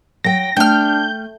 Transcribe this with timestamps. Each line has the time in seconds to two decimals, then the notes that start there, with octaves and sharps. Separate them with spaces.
0.24 F#3 G5 A#6
0.57 A3 D4 G5 F6 G6